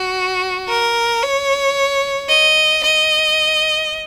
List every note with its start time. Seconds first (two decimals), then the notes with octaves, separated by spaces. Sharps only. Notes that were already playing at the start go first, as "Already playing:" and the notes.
Already playing: F#4
0.68 A#4
1.23 C#5
2.29 D#5
2.83 D#5